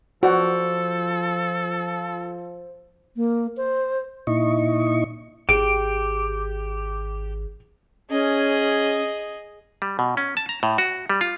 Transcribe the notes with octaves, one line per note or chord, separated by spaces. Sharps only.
F3 F#4 A4 C5 D5 F#5
A#3
C5
A#2 D#4 E4 D#5 C#6
G#1 G4 G#4 D7
C#4 G#4 D#5
G3
B2
C#4
A5
A#5
A2
F#4
G3
F4